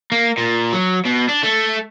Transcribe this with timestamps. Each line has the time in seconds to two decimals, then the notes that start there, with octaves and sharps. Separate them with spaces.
0.12 A#3
0.38 A#2
0.73 F#3
1.05 B2
1.29 D4
1.44 A3